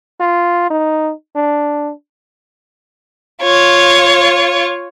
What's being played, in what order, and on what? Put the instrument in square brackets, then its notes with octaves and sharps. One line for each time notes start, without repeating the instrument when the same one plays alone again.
[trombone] F4
D#4
D4
[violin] F4 C#5